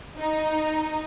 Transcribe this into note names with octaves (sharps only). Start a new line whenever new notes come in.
D#4